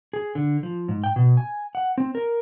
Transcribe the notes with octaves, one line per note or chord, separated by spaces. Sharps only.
G#4
D3
F3
G#2
G5
B2
G#5
F#5
C4
A#4